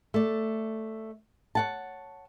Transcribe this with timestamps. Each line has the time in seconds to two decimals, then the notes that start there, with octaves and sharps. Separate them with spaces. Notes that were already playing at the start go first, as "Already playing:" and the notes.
0.14 A3 D5
1.55 C#5 F#5 A5